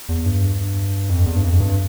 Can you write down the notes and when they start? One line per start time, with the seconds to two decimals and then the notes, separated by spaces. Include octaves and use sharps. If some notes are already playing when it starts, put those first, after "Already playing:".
0.09 E2
0.26 G2
1.09 F2
1.26 E2
1.35 G2
1.44 F2
1.60 G2